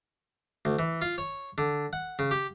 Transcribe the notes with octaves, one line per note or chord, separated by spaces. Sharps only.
D2
E3
F4
C#5
D3
F#5
C#3
G4